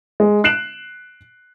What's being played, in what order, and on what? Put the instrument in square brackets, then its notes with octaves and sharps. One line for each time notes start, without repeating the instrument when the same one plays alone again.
[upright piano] G#3
F#6 C7 D7 E7 F#7